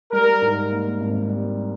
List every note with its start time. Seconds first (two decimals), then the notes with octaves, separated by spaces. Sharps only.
0.12 G3 A#4
0.42 G#2
0.70 A#3
1.00 G#1
1.29 G3